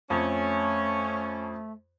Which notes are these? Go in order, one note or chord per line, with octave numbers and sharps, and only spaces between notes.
F2 A3 C#4